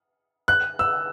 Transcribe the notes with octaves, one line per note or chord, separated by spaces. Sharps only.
F#6
E6